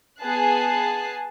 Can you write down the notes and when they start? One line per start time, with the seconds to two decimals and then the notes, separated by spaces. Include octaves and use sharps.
0.22 B3 G#4 G#5 A5 F#6 C7